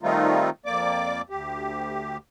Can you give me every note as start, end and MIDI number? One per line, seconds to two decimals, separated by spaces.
0.03 0.50 51
0.03 0.50 55
0.03 0.50 57
0.03 0.50 60
0.03 0.50 63
0.03 0.50 65
0.66 1.21 41
0.66 1.21 58
0.66 1.21 74
0.66 1.21 86
1.30 2.17 38
1.30 2.17 67